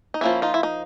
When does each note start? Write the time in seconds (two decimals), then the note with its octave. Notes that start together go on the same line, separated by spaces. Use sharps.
0.14 D#4
0.21 F3 A#3 C#4 E4
0.42 D#4 F4
0.54 E4
0.63 D#4